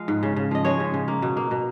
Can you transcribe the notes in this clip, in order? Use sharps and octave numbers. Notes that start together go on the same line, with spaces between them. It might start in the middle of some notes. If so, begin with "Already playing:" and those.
Already playing: F3 G#3 F5
G#2
C#3
C#3
F3 D#5
G#3 C#5
C#3
C#3
A#3
B2
A#3
B2